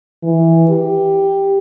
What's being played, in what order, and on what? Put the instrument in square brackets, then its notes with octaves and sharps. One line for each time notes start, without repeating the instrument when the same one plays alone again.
[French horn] E3
G4